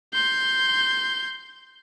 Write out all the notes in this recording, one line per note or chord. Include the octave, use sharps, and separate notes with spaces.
C6 G6